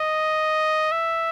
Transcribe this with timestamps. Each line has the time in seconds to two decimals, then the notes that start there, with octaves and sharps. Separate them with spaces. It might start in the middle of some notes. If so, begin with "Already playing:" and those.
Already playing: D#5
0.92 E5